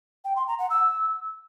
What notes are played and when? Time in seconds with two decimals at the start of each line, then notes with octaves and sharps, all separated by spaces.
0.25 G5
0.36 C6
0.47 A#5
0.59 F#5
0.70 E6